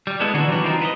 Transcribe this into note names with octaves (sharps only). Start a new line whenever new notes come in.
G3
G#3 B3 E4 A4
D3 E3 A#3 D4 F#4
E3 F#3 G3 C4 D4 F#4
E3 G3 C4 D#4 F4 A#4
B4 C5 D#5